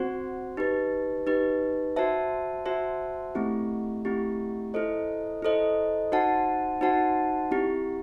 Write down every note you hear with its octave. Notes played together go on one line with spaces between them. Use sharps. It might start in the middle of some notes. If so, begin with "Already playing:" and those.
Already playing: C4 F#4 C5
D#4 G4 B4
D#4 G4 B4
F#4 C5 E5 A5
F#4 C5 E5 A5
A3 C4 E4 G4
A3 C4 E4 G4
E4 A4 C5 D#5
E4 A4 C5 D#5
D#4 F#4 C5 F#5 A5
D#4 F#4 C5 F#5 A5
C4 E4 G4